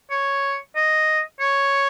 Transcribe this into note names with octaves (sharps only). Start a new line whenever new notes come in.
C#5
D#5
C#5